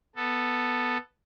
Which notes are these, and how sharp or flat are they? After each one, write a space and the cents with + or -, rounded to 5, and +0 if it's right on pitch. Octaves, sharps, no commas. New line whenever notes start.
B3 +0 A4 +0